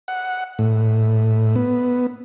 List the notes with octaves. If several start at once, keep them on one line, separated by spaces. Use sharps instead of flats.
F#5
A2
B3